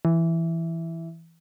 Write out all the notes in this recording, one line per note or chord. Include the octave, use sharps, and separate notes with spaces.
E3